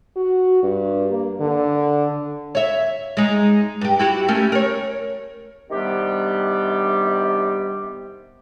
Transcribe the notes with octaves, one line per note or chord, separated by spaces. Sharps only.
F#4
G2
A#3
D3
C#5 E5
G#3 D#4
G2 G4
E4 F#4 G4
A3 C#4 A#4
A#4 C#5
C3 D#3 G3 B3 D4 G4